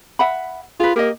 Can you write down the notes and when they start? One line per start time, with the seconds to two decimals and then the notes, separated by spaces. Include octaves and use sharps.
0.19 E5 F#5 B5
0.80 F4 G#4 B4
0.96 A#3 G4 D#5